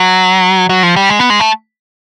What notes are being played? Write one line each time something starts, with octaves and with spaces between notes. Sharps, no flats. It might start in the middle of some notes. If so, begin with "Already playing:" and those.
Already playing: F#3
F#3
F3
G3
G#3
B3
G#3
A3